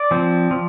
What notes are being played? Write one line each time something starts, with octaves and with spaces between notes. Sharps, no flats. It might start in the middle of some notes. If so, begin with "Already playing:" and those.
Already playing: D5
F3 C4
F3